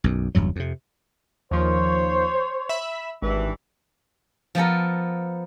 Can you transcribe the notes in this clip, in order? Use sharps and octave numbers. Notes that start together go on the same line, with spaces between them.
B1 F#2
F#1 E2 G2 F#3
F2 C3
D#2 F3 C5 C#5
E5 B5
G#1 G2 E3
F3 B3 A4 A#4